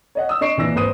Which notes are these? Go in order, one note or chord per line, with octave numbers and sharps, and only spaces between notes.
C#5 D#5 F#5
D#6 E6
D4 D#5 C#6 C7 D7 E7
A#1 E3 D4 E6 A#6
G#1 B4 C5 D#6 D#7